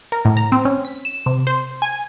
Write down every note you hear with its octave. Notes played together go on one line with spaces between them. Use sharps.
A#4
A2
A#5
C4
C#4
B6
E7
C3
C5
G#5